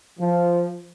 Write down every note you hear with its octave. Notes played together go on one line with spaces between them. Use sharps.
F3